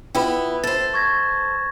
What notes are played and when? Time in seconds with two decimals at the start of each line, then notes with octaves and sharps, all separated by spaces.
0.15 B3 E4 F4 B4 G5
0.64 A4 C5 A6
0.94 C#6 G#6 A#6